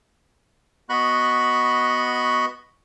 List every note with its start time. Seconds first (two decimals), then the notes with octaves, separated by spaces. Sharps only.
0.89 B3 F#4 D#5 B5 C#6 F#6